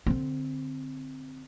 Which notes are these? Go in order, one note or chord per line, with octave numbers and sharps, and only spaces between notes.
D3 C4